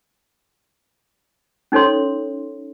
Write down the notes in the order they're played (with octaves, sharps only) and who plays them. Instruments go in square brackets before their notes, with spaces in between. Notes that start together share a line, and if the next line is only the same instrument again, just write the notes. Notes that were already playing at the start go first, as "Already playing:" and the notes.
[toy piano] C#4 D#4 A4 C#5 C6